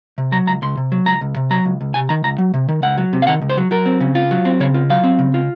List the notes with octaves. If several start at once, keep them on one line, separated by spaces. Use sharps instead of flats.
C3
F#3 A#5
C#2 A#5
C#2 C6
C3
F#3
C#2 A#5
C#2
C3
F#3 A#5
C#2
C#2
C3 G#5
D#3 A#5
C#2 A#5
F#3
C3
D#3
C#2 F#5
F#3
C3
F5
D#3 F#5
C#2
C5
F#3
F#3 A#4
C4
C#3
F4
F#3
C4
C#3 C#5
F4
F#3 F5
C4
C#3
F4